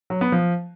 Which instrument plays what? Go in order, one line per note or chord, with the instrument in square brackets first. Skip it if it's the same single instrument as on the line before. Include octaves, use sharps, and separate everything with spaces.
[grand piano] F#3
B3
F3